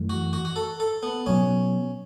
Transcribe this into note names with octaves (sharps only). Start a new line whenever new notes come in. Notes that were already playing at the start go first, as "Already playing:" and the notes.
Already playing: F#2 E3 A3
F#4
F#4
F#4
A4
A4
B3
B2 F#3 B3 C#4